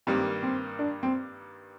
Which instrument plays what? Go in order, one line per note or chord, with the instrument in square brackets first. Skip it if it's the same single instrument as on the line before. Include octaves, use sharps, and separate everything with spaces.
[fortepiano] G2 D#3 G3 A#3 [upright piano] C4
[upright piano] C4
D4
C4